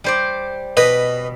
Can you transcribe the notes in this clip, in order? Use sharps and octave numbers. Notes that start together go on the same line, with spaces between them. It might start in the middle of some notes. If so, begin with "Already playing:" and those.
G3 C5 D5
B2 B4 D#5